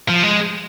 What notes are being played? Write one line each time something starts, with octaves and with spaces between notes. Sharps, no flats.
F3
G#3